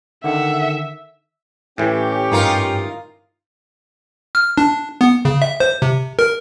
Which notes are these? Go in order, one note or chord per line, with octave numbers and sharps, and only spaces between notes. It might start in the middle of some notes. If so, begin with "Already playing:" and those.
D3 D#3 E5 F#5
A2 E3 C#4 G4
G2 D#4 F4 A#4
F6
D4
B3
C#3
E5
C5
C3
A#4